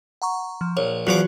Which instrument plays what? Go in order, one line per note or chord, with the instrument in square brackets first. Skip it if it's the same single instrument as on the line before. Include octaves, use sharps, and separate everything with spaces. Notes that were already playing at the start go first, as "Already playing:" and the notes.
[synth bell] F#5 A#5 C#6
F3
[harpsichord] A#1 [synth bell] C#5
[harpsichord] E2 F3 D6 [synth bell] F#3 F4 F#4